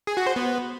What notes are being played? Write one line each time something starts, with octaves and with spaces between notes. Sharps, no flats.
G#4
F#4
C5
B3